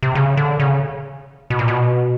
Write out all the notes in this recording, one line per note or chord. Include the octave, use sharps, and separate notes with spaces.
C3
C#3
D3
C#3
B2
A#2
B2